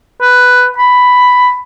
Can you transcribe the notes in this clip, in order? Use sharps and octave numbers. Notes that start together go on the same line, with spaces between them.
B4
B5